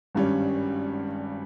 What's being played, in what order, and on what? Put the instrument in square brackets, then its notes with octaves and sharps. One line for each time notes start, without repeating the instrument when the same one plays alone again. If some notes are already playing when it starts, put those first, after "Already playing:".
[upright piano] G#1 G2 G3 C#4